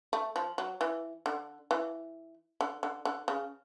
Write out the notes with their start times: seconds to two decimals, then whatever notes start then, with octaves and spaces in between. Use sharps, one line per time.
0.13 A3
0.36 F3
0.58 F#3
0.81 E3
1.26 D3
1.71 E3
2.61 D3
2.83 D3
3.05 D3
3.28 C#3